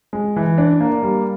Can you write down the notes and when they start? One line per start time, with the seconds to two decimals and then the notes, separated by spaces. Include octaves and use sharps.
0.13 G#3
0.36 E3
0.58 D4
0.81 A#3
1.03 G3